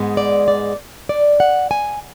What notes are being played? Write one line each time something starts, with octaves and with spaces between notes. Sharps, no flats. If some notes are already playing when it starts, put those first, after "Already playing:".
Already playing: G#2 G#3 B3
D5
D5
D5
F#5
G#5